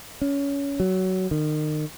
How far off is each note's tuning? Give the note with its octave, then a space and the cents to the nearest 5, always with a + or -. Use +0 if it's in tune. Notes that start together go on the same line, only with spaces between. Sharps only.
C#4 +20
F#3 +15
D#3 -30